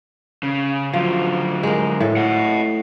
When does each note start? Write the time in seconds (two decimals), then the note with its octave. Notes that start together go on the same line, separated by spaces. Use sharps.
0.43 C#3
0.93 D3 F3 F#3
1.63 G#3 A#4
2.00 A2 A4
2.17 D#5 F#5